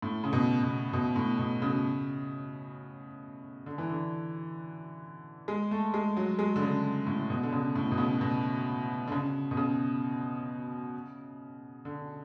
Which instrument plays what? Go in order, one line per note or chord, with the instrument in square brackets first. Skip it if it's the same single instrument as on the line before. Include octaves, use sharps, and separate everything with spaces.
[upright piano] A2
C#3
B2
B2
B2
A2
B2
C#3
D3
E3
D3
G#3
A3
G#3
F#3
G#3
D3
C#3
A2
B2
D3
C#3
A2
B2
C#3
B2
D3
C#3
B2
C#3
D3